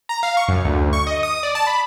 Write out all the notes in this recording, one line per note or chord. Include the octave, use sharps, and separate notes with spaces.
A#5
F5
C#6
F#2
D2
C#6
D#5
D#6
D5
A5
B5